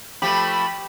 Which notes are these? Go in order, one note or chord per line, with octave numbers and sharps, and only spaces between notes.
F3 A3 G4 B5